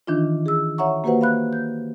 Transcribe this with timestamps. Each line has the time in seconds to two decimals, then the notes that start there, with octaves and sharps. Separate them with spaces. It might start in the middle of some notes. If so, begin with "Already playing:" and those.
0.07 D#3 E3 D4 D#4 F4
0.46 G#4 E6
0.78 C#5 E5 F#5 A#5 C#6
1.04 A#3 F#4 G4 B4 C5 F#5
1.21 F5 B5 F#6
1.53 G6